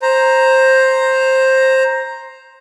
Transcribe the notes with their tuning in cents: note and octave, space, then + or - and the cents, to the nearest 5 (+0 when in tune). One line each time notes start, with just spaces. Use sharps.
C5 +10 A#5 +0